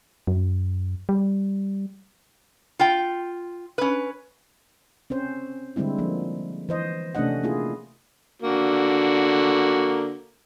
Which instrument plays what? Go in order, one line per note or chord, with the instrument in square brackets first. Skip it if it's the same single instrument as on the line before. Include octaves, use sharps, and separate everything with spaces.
[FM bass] F#2
G3
[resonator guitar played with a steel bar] F4 G5
C#4 B4
[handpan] C4 C#4 C5
D3 G3 G#3 C4 E4
F3 A#3
E3 C5 D#5
C3 A3 C#4 D4 D#5 F#5
A#3 E4 F4 G#4
[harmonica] D3 A#3 F#4